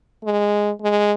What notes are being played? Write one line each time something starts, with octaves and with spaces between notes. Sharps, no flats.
G#3
G#3